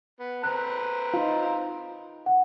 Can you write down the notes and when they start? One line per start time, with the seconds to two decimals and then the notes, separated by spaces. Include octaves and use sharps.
0.20 B3
0.44 C4 B4 A#5 F#6
1.14 D#4 F4
2.26 F#5